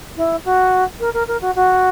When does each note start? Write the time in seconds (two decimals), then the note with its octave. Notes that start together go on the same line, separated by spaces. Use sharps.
0.17 E4
0.45 F#4
1.00 A#4
1.13 A#4
1.27 A#4
1.41 F#4
1.55 F#4